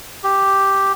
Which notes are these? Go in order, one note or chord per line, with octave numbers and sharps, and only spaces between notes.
G4